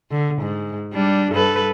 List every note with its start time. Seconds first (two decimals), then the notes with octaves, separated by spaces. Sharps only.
0.11 D3
0.42 G#2
0.93 G3 D4
1.32 G2 A4 B4